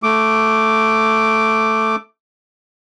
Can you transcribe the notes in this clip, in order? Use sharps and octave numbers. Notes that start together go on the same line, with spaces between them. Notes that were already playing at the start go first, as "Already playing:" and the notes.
A3 D6